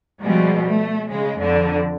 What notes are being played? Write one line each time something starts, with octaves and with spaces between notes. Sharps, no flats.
B2 F3 G3 G#3
A3
C#3 G#3
F2 D3